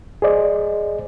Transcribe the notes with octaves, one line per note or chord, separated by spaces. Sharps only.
G#4 C5 D5 D#5